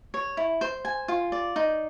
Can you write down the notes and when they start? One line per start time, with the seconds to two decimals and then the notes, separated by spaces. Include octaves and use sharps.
0.14 C#5
0.37 E4
0.61 C5
0.85 G#5
1.08 F4
1.32 D5
1.56 D#4